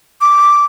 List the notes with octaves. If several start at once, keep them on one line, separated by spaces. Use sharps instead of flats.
D6